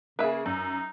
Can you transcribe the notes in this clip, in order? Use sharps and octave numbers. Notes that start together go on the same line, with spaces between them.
C#3 A#3 G#4 B4 E5
F#2 D#4